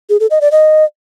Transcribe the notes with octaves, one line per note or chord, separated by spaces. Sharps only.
G#4
A4
D#5
D5
D#5